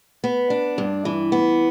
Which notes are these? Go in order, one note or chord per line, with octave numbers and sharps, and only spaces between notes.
B3
D4
G2
E3
B3